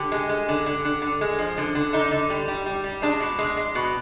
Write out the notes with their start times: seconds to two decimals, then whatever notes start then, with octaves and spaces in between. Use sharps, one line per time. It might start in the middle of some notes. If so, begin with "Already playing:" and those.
Already playing: D3 G4
0.12 G#3
0.29 G#3
0.48 D3
0.66 D3
0.85 D3
1.02 D3
1.21 G#3
1.39 F3
1.58 D3
1.75 D3
1.93 D3 D#4
2.11 D3
2.30 G3
2.48 G3
2.66 G3
2.84 G3
3.02 G#3 D4
3.20 B2
3.38 G#3
3.57 G#3
3.75 B2